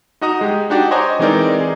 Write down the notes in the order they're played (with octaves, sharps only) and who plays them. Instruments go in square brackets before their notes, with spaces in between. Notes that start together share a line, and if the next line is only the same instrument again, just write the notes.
[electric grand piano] D#4 F#4 D#5 A#5 D#6
G#3 G4
D4 D#4 F#4 G4 D5
C5 C#5 D#5 G#5 A#5 D6
E3 G#3 C4 D#4 A#4 D5
G#4